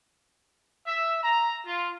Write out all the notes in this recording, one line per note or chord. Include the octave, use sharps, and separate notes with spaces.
E5
A#5
F4